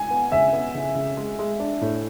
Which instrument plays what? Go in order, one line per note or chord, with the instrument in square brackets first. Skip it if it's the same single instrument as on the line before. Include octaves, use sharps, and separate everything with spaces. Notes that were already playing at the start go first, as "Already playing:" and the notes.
Already playing: [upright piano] G#5
[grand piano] B3
[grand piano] C#3 [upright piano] E5
[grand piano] B3
C#3
C#3
G#3
G#3
D4
A2